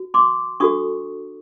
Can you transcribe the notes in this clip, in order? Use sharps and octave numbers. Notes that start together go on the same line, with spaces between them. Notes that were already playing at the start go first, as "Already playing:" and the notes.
Already playing: F#4
C6 D6
D4 F#4 A4 C#6 D#6